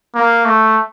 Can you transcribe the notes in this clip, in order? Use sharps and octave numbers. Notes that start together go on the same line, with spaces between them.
A#3
A3